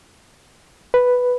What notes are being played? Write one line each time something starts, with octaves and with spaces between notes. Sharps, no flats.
B4